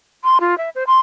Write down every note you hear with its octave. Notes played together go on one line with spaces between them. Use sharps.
C6
F4
E5
C5
C6